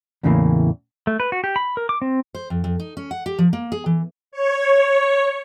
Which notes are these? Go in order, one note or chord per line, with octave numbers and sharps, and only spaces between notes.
E2 A2 C#3 E3 A#3
A3
B4
F#4
G4
B5
A#4
D6
C4
C5
F2
F2
D#4
C#4
F#5
G4
F3
A#3
G#4
E3
C#5